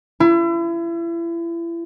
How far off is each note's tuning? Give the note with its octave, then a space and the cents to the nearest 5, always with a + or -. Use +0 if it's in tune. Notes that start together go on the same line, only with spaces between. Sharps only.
E4 +35